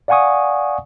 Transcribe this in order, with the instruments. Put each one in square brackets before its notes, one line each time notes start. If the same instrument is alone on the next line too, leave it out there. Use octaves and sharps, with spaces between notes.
[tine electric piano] D5 F5 F#5 G#5 C#6 D#6